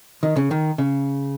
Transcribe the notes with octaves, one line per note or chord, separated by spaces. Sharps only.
D#3
C#3
D#3
C#3